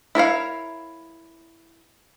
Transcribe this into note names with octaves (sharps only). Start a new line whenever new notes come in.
E4 A#4 C#5 F5